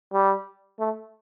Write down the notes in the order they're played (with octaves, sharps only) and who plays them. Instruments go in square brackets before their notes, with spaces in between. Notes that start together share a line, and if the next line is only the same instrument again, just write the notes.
[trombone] G3
A3